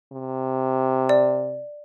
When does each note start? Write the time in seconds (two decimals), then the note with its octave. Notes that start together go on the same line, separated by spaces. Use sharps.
0.12 C3
1.09 D5